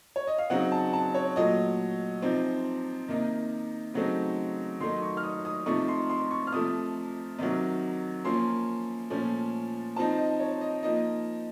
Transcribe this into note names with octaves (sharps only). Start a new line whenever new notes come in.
C#5
D#5
F5
C#3 F#3 C4 D#4 F#5
A5
A5
C#5
A#2 F#3 A3 D#5
C3 F3 C4 D#4
C3 D#3 A#3 D#4
C#3 F#3 A3 C4 D#4
D#3 F#3 A3 D#4 C6
C#6
F6
D#6
D#6
C3 F3 A3 D#4 C#6
C6
C6
C#6
F6
C3 F3 A3 D#6
C3 D#3 F#3
F3 A#3 C#4 C6
A#2 F3 A3 C#4
F3 C4 D#4 A5
D#5
C#5
D#5
F3 A#3 D#4 D#5